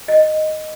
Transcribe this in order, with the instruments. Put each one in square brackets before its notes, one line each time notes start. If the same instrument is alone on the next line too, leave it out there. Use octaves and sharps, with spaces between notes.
[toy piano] D#5